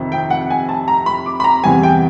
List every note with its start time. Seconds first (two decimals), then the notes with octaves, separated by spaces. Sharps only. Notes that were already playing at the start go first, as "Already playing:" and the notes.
Already playing: F2 C3 D#3
0.12 G5
0.30 F#5
0.50 G#5
0.69 A5
0.88 A#5
1.06 B5
1.26 D6
1.40 B5
1.44 A#5
1.64 E2 C3 E3 G3 G#5
1.83 G5